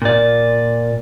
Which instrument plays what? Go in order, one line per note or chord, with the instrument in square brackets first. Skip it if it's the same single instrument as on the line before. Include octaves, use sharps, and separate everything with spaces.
[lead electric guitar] A#2 D5